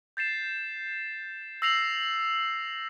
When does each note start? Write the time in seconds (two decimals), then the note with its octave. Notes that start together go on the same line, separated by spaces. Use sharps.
0.17 G6 A6 C7 E7
1.62 E6 A#6 C7 F7 F#7